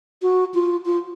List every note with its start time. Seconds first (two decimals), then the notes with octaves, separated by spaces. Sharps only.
0.22 F#4
0.54 F4
0.86 F4